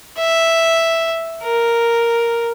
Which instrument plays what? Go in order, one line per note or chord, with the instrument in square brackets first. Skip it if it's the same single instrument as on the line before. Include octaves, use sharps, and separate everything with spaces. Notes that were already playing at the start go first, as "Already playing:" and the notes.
[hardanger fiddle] E5
A#4